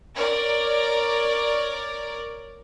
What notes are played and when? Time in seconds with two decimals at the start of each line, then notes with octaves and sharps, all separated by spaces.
0.16 A#4 C#5 D5